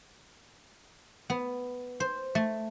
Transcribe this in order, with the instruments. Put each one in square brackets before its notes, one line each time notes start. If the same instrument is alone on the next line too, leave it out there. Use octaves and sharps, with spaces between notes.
[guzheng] B3
C5
A3